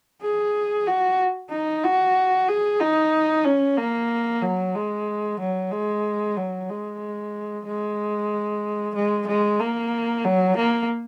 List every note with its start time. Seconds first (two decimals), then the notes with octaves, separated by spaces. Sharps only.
0.22 G#4
0.87 F#4
1.51 D#4
1.84 F#4
2.48 G#4
2.81 D#4
3.45 C#4
3.77 A#3
4.42 F#3
4.75 G#3
5.40 F#3
5.72 G#3
6.37 F#3
6.69 G#3
7.66 G#3
8.95 G#3
9.27 G#3
9.60 A#3
10.25 F#3
10.57 A#3